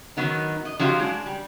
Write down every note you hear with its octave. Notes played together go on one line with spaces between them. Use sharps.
D#3 F#3 B3 D#4
D#5
F3 F#3 D#4 F4 G4
G#3 D4
G3